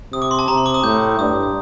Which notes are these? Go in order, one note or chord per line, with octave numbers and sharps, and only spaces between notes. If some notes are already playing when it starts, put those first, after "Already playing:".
C3 D#6
D6
C6
A5
C3 A#5
C6
D6
D#6
A2 G6
G2 D#6